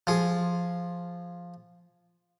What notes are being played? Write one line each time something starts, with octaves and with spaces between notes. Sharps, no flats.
F3 G#4